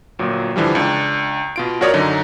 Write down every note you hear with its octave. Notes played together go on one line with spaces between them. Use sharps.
G1 A#2 F#3
D3 E3 F3 G3
C#2 D4
B2 F4 D7
F#2 F#4 A#4 C#5 D5 D#6
F#2 D3 F#3 D#4